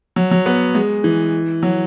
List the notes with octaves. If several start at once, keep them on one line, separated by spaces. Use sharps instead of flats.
F#3
F#3
B3
G#3
E3
F#3